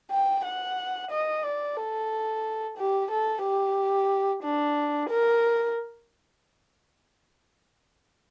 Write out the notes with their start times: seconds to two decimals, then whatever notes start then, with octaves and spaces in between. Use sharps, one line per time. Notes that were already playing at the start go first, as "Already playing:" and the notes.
0.11 G5
0.45 F#5
1.11 D#5
1.44 D5
1.77 A4
2.78 G4
3.11 A4
3.43 G4
4.44 D4
5.10 A#4